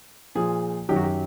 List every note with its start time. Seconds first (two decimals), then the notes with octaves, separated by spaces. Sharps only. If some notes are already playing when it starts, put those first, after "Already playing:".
0.35 A#2 F3 G#4
0.89 F#2 D#3 F#3 G4
0.96 F#4
1.03 G4